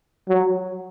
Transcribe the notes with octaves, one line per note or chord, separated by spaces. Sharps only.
F#3